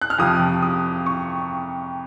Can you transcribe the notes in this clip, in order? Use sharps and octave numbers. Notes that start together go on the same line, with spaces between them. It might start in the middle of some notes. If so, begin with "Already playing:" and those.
F#6
F6
F2 C3 F3 D#6
D#6
C#6